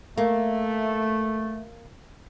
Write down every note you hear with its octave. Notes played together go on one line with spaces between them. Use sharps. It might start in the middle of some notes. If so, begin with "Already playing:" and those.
A3 A#3